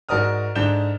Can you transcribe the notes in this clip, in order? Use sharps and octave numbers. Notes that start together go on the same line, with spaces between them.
G#2 F#4 A#4 D5 D#6 F6
G#2 D3 D4 G6 E7 G7